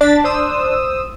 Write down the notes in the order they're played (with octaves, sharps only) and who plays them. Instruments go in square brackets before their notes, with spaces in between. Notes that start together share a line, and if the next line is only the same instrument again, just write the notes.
[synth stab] D4 [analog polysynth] A6 B6
[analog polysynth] C5 D#6 E6